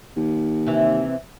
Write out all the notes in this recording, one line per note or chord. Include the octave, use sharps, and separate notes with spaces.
D#2
C3 E3